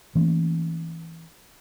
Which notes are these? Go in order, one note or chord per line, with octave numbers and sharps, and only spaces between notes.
E3 A3 A#3 C#4